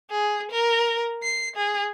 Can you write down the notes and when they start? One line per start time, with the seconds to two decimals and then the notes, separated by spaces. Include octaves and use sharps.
0.11 G#4
0.51 A#4
1.23 C7
1.56 G#4